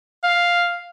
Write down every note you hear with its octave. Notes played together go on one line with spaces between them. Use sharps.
F5